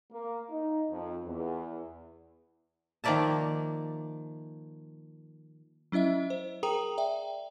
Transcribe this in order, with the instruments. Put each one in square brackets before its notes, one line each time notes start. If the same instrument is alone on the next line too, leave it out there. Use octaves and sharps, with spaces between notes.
[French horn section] A#3
D#4
F2
E2
[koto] D#3 F3 A#3 D5 E5 A5
[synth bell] F#3 C#4 E4 D#5 E5
C5
G#4 A#4 G5 A#5 D#6 F7
D5 E5 G5